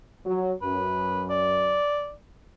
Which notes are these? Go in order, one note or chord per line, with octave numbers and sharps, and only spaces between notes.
F#3
F#2 B4
D5